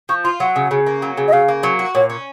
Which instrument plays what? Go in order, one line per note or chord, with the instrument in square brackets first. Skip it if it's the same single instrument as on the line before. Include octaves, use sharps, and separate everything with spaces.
[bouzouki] F3 [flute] C#6
[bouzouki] F4 [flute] C6
[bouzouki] F#3 [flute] F#5
[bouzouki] C#3
C#3
A#3
F#3
C#3
[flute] D#5
[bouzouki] C#3 [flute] F5
[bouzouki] A#3
F#3
F#4
[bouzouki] A#2 [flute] C#5
[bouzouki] C#4